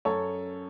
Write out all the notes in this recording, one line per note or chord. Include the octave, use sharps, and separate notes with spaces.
F#2 A4 C#5